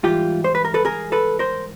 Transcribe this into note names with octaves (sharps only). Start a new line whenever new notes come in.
G#2 E3 G3 F4 G4
C5
B4
A#4
A4 B4
G#4 A#4
A4 B4
A#4 C5